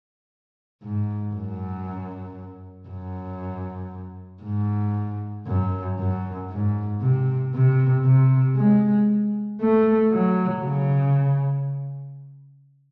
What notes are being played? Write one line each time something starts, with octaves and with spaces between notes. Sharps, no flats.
G#2
F#2
F#2
G#2
F#2
F#2
G#2
C3
C3
C3
G#3
A3
F#3
C#3